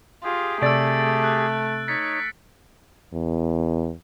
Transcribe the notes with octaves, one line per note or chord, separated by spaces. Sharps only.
F4 G4 G#4
C3 A3 D5 E6 A6 D7
F#6
D#4 C#5 A6 B6 C#7
E2